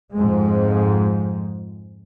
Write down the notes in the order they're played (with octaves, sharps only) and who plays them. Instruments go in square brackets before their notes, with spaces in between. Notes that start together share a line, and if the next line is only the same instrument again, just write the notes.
[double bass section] F2 G#2 F3 G#3